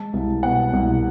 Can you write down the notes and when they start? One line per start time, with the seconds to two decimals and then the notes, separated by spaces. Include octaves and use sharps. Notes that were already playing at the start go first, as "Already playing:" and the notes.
Already playing: G#3 A5
0.13 C2
0.43 B2 F#5
0.73 C2